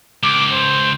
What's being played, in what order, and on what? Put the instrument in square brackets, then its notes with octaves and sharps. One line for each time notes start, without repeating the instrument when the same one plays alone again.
[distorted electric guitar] C#2 [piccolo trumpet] D6
[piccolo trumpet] C5